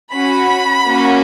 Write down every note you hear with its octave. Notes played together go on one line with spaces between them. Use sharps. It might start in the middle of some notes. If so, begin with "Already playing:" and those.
C#4 F#4 B5
A#3 C#4 F#4